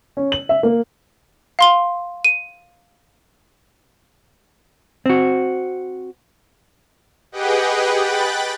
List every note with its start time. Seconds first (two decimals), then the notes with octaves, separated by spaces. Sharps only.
0.17 C#4
0.32 F#7
0.49 E5
0.63 A#3
1.59 F5 C6 G7
2.25 D#7
5.06 C4 F#4
7.32 G4 G#4 B4 D#5 F#5 G5
7.98 G5 B5 F#6 A6